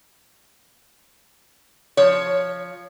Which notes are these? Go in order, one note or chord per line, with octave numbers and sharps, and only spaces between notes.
F3 C#5